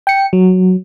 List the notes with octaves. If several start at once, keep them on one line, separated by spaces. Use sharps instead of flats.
G5 C#7
F#3